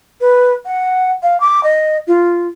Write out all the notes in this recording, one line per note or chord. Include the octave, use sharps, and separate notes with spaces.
B4
F#5
F5
D6
D#5
F4